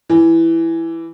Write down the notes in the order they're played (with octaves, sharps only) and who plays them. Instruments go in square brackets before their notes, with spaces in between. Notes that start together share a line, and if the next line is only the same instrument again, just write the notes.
[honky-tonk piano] E3